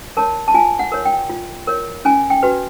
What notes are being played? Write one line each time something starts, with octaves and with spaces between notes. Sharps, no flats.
A#4 C#5 A5
A5
F4 G#5
F#5
A#4 C#5
G5
F4
A#4 C#5
C#4 G#5
G5
F#4 B4